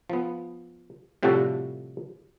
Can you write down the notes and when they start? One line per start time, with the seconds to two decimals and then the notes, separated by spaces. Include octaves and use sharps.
0.10 F3 B3
1.23 A2 C3 F3 G3 F#4 A4